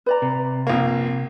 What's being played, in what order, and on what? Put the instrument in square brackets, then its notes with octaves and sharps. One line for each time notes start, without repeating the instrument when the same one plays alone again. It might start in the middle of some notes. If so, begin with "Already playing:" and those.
[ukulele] B4 D5 A#5
[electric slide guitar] C3
[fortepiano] A#1 A#3